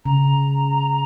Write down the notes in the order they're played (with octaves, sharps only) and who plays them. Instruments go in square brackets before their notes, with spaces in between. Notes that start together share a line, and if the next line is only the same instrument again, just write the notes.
[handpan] C#3 [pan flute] A#5